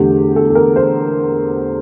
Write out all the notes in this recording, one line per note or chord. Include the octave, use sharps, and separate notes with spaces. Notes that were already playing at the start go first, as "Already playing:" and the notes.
Already playing: E2 D3 A3 G4
A4
A4
A#4
C5